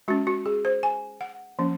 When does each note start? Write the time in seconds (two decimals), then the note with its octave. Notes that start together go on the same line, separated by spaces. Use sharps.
0.08 G#3 C#4 F#4
0.27 F#4
0.46 G#4
0.65 C5
0.83 G#5
1.21 F#5
1.59 F3 A#3 C#4